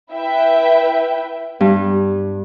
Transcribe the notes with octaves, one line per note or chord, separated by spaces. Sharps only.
E4 B4 E5 G5
G2